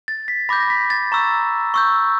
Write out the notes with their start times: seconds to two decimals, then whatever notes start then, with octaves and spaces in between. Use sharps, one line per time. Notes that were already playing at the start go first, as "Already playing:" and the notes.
0.08 A6
0.28 B6
0.49 B5 D6 G6 A#6
0.60 A#6
0.70 B6
0.90 A6
1.12 A#5 C#6 E6 G6
1.74 C#6 E6 G6